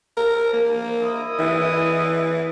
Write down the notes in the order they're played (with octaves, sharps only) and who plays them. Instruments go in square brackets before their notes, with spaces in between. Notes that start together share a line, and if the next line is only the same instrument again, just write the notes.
[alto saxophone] A#4
A#3
[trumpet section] E4 D#5 D#6
[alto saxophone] E3